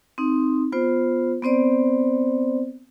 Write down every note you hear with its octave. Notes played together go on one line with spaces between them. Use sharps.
C4 D#4
B3 F4 C5
B3 C4 C5 D5